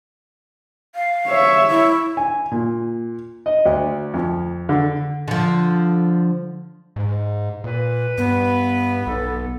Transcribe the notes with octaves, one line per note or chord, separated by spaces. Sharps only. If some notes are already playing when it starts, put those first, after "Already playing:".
F5
C#5 E5
E4
G#5
A#2
D#5
D2
F2
D3
D3 F3
G#2
A#2 B4
G2 B3
B1 A4